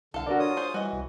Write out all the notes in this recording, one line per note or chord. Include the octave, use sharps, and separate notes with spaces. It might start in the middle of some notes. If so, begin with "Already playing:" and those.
C2 D3 A4 F5
D4 F#4 A#4 D5
F4 C#5 D#6
G#4 C5
E3 G3 F#4 D#5
C2